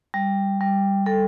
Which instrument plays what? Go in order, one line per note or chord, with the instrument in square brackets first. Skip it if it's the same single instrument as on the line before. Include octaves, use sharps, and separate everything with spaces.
[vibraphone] G3
G3
G3 A4